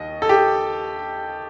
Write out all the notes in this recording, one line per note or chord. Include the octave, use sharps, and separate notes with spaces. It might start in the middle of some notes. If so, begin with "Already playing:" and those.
Already playing: D#2 D#5
A4
G4